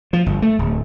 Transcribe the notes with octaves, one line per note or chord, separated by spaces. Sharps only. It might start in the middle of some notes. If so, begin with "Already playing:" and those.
F3
G1
A3
D1